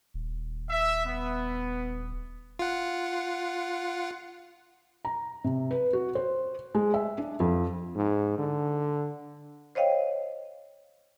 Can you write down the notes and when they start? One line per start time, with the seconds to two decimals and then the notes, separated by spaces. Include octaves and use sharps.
0.14 D#1
0.69 E5
1.06 B3
2.59 F4 F#5
5.05 A#5
5.44 C3
5.71 B4
5.93 F#4
6.15 C5
6.75 G#3
6.94 E5
7.18 D4
7.40 F2
7.95 G#2
8.38 D3
9.75 C5 C#5 D#5 F5 G5